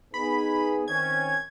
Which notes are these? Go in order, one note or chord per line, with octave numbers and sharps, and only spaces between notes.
B3 D#4 G#4 B5
D#3 C4 C#4 G#6